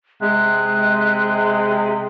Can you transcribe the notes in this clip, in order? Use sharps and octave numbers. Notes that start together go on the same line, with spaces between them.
C3 G#3 F#6